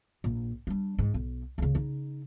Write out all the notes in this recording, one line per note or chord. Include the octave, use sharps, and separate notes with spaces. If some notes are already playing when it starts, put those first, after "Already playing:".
A#1
G3 D4
G#2
B1
C#2 C#3
C#3 D#4